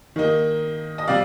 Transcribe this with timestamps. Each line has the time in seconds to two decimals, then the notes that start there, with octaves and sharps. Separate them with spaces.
0.16 D#3 A#3 D#4
0.98 D#5
1.07 C3 G3 C4 D5 F5